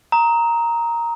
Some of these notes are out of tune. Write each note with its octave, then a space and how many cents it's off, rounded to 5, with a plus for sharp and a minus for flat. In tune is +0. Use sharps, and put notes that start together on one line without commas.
A#5 +0 D#6 +30